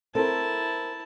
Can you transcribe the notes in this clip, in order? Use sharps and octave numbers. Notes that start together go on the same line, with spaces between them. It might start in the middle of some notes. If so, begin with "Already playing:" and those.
C4 E4 A4 A#4 A5